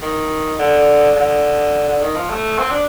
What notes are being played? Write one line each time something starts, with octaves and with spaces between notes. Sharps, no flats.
D#3
D3
D3
D3
D#3
F3
A3
C4
D4